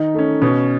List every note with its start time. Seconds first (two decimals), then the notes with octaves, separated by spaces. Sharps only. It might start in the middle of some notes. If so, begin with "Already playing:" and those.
Already playing: D#3 D#4
0.14 A3 C#4
0.42 B2 C#4